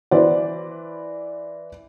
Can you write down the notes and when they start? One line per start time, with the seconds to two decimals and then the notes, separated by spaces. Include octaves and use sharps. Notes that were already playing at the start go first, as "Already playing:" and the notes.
0.11 E3 B4 C5 D5